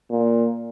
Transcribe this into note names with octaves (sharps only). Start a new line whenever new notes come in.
A#2